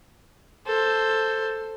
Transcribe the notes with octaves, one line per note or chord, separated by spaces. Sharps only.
A4 C5